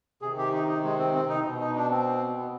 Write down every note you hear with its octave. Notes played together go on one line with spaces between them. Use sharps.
C3 D#3 G#4
G4
D#4
D#4
G#3
C4
C4
D#4
B2
D#4
D4
C4
B3